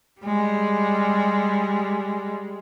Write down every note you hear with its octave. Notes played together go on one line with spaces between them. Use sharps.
G3 G#3